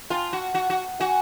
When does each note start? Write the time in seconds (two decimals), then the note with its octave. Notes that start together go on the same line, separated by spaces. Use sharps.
0.10 F4 G5 A5
0.33 F#4
0.55 F#4
0.70 F#4
0.99 F#4 F#5 G#5